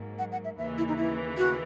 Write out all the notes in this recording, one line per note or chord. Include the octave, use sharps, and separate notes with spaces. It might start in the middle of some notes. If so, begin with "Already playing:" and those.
Already playing: G#2 F#3 A#3
F#5
F#5
E5
D#2 C#3 E3 E5
E4
D#4
E4
F#4